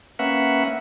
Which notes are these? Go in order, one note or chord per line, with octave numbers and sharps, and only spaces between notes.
A#3 C#4 B4 E5 F#5